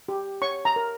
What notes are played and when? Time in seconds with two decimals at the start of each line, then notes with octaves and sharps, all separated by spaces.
0.08 G4
0.42 C#5 C#6
0.65 A#5
0.76 A#4